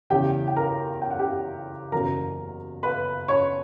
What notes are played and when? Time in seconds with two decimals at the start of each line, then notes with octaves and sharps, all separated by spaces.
0.10 E2 C#3 E3 G4 G5
0.47 G5
0.56 A#4 A#5
1.02 G5
1.11 F#5
1.19 G4 G5
1.92 F#1 E2 B2 F#3 A#4 A#5
2.83 B4 B5
3.28 C#5 C#6